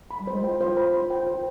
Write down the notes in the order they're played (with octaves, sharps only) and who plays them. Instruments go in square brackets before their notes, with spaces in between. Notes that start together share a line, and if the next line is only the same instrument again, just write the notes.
[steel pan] B5
[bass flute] G3
[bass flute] G#3 [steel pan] C5
[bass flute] F4 [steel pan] G5
[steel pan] C5
B5
C5
G5
C5